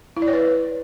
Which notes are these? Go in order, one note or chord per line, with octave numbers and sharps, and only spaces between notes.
E4
D5
C#5
B4